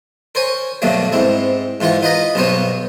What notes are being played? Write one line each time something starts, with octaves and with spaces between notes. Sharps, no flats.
A#4 C5 C#5 G#5
G2 B2 D3 F#3 A3 A#3
G#2 C4 E4
G#2 E3 F4 A#4 F#5
D#4 F4 B4 D#5 A#5 B5
B1 G2 B2 B3 C5 C#5